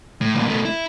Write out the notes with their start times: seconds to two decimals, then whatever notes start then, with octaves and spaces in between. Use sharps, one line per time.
0.21 A2
0.35 C2 A#2
0.48 B2 A3
0.65 E4